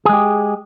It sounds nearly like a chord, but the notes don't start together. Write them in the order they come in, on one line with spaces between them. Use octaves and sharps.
G#4 G#3 G4